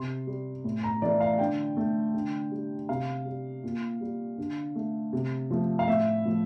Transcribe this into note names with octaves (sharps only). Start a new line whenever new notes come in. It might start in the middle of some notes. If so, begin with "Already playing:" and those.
Already playing: C3 C6
G3
A2
A#5
E3 A3 D5
F5
D3 G5
A3
D3
G3
C3 F5
G3
A#2
G3
D3
A3
C3
F3 A3
F5
A2 E5
F3 A3